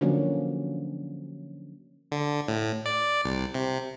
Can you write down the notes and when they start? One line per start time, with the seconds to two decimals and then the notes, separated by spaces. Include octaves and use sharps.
0.01 D3 F3 F#3 A#3 C#4 D4
2.12 D3
2.48 A2
2.86 D5
3.24 C2
3.54 C3